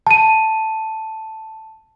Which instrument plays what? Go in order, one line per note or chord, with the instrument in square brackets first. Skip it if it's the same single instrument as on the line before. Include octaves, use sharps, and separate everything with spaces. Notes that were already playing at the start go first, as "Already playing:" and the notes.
[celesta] A5 D#7